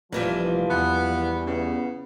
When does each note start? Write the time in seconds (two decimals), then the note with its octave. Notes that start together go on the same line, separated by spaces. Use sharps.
0.12 F1 A#2 E3 F3 G3
0.70 E2 B3
1.46 C#3 B3